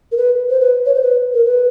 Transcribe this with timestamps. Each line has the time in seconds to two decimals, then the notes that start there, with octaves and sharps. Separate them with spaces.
0.12 A#4
0.17 B4
0.50 C5
0.60 B4
0.86 C#5
0.94 C5
1.02 B4
1.34 A#4
1.45 B4